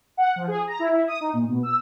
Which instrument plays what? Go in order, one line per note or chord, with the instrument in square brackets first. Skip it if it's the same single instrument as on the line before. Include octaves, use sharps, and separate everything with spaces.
[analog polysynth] F#5
F3
G#4
A#5
E4
E4
D#6
D#4
A#2
B2
E6